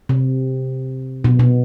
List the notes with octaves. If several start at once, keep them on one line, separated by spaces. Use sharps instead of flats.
C3
B2
B2